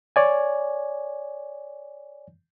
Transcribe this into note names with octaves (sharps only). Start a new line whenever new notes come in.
C#5 D5 G#5